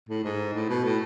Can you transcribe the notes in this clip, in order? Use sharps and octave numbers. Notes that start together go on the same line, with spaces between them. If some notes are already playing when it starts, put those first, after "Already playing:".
A2
G#2
A2
B2
A2